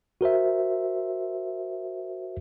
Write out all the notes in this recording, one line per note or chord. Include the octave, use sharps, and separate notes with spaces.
F#4 A#4 C5 E5